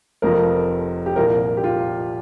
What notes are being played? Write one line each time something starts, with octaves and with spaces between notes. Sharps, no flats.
F1 F2 F3 A#4
G4
C2 A#2 F3 A#4
G4
F4